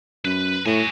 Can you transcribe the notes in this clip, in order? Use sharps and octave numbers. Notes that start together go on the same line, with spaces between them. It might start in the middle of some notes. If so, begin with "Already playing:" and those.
F#2 B4
A2 F#4 G#5